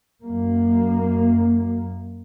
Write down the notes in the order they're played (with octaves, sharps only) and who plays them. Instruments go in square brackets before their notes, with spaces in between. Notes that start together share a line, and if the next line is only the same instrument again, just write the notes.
[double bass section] F#2 A#3